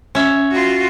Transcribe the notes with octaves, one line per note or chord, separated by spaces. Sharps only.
C#4 E5
F4 F#4